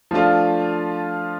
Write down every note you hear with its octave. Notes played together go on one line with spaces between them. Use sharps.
F3 A3 D4 F4